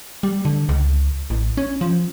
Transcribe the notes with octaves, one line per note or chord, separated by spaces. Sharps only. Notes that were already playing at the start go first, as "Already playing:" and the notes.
G3
D3
C#2
A1
C#4
F3